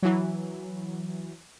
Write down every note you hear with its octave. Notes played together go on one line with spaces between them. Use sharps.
E3 F#3